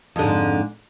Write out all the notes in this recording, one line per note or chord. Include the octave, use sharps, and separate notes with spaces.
F2 G#2 D3